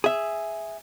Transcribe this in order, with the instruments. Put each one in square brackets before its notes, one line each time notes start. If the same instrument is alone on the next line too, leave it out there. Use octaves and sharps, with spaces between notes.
[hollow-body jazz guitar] G#4 E5